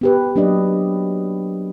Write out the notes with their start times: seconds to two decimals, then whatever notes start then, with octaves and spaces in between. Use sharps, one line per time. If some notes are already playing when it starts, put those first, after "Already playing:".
0.01 B3 G4 B4
0.36 F#3 A#3 D4 G4 D5 D#5